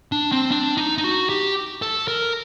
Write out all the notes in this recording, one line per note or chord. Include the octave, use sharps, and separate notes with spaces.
D4
C4
D4
D#4
D#4
F#4
G4
A4
A#4